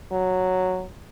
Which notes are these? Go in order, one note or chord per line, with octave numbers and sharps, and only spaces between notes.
F#3